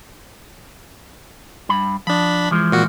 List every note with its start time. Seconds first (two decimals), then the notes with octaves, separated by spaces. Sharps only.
1.69 G2 B5
2.07 F3 D4 B5
2.51 E3 F3 G#3
2.72 A#2 F#4